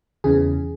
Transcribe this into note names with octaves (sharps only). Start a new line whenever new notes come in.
E2 C#3 E3 G#4